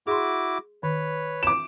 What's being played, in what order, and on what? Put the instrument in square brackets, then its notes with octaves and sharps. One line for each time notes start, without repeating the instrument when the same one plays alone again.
[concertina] E4 F#4 D6 [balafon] G#4 C6
[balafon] D#3 [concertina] B4 C#5
[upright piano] D6 E7